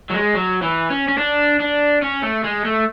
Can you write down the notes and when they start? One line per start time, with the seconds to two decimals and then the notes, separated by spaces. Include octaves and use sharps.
0.10 F#3
0.14 G#3
0.34 F#3
0.62 E3
0.90 C#4
1.08 C#4
1.18 D4
1.60 D4
2.02 C#4
2.22 A3
2.44 G#3
2.64 A3